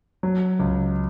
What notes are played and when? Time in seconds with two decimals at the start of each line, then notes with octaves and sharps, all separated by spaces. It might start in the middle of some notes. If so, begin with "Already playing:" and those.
0.23 F#3
0.59 C#2